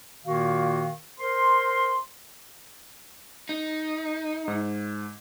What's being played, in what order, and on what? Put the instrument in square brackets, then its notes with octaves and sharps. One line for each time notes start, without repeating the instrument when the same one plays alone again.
[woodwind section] A#2 D#3 A#3 F#4 F5
A#4 C5 C6
[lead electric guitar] D#4
[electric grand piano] G#2